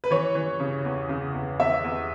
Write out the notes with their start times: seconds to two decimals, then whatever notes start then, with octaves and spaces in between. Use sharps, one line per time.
0.04 B4
0.11 E3 C#5
0.35 E3
0.60 C#3
0.85 E2
1.09 C#3
1.34 E2
1.60 E2 E5
1.84 E2